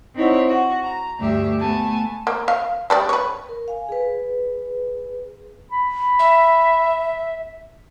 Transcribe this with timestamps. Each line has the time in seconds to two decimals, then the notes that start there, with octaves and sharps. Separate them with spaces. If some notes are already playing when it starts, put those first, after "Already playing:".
0.15 C4 D#4 E4 C5 C#5 F#5
0.49 F#4
0.84 A#5
1.20 D2 G2 G4 E5
1.59 A3 B3 G#5 A5
2.27 A#3
2.48 F5
2.90 G3 G#3 D5
3.09 B4 C#5
3.49 A#4
3.68 F5 G#5
3.89 G#4 B4
5.71 B5
6.19 E5